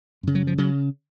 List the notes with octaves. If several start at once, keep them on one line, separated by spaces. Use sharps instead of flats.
F#2 C#3
F#3
F3
C#3 F#3